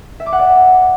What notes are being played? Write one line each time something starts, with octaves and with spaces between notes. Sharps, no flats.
E5
D6
F#5
D5